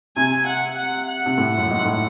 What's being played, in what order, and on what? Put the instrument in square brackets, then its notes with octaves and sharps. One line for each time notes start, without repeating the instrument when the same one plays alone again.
[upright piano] C3 [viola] G#5
[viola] F#5
F#5
F#5
[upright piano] C3
A2
F#2
G#2
A2